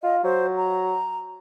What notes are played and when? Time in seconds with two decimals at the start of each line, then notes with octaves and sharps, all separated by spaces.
0.03 F4 D#5
0.24 F#3 C5
0.57 A#5